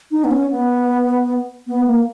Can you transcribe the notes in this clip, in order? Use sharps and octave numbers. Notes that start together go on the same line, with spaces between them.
D#4
B3
C#4
B3
B3
A#3